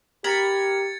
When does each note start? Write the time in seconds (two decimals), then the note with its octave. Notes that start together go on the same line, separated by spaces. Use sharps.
0.24 G4 A#4 B5 G#6 A6 C#7